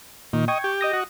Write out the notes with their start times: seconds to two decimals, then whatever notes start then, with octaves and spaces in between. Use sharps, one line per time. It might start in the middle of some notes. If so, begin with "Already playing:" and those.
0.33 A#2 D#3
0.48 D#5 G5 C#6 G#6
0.64 G4
0.81 D#5 D#6 A#6
0.93 F#4